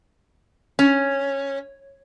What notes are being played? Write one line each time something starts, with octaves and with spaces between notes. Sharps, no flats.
C#4